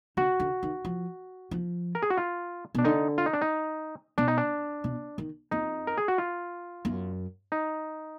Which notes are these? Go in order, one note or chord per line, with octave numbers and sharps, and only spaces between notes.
D3 F#4
D3
D#3
F3
F3
A#4
G#4
F#4
F4
B2 D4
D3 D#4
F4
D#4
D4
D#4
B2 D4
D#4
D4
B2
D#3
F2 D#4
A#4
G#4
F#4
F4
F#2
D#4